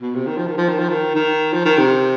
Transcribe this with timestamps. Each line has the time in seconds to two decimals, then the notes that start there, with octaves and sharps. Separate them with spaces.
0.02 B2
0.15 C3
0.27 D#3
0.37 F3
0.48 D#3
0.58 F3
0.69 D#3
0.79 F3
0.89 D#3
1.15 D#3
1.53 F3
1.66 D#3
1.78 C3